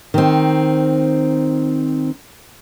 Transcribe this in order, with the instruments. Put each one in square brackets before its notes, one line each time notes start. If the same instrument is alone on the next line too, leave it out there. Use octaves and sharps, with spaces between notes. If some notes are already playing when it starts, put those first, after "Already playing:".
[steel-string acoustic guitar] D#3 C4